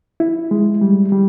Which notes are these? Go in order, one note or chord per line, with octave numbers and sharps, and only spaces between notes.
E4
G#3
G3
G3